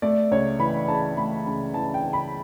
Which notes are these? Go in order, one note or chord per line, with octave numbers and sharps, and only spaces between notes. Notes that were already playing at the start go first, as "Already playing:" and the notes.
A3 D5
C#2 C#5
E3 B5
C#3 A5
A3 B5
C#2
E3 A5
G5
C#3
B5